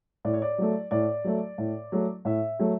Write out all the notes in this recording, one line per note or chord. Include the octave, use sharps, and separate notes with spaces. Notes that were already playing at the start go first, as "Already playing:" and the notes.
A2 D5
C#5
D5
F#3 A3
A2 D5
F#3 A3
A2
F#3 A3
A2 E5
F#3 A3